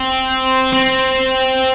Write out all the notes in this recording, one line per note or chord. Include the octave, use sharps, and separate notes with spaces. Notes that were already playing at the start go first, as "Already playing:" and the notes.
Already playing: C4
C4